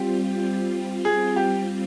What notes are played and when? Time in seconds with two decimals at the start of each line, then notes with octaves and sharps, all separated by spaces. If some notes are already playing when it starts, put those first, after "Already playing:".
Already playing: G3 C4 F4 G4
1.05 G#4
1.36 G4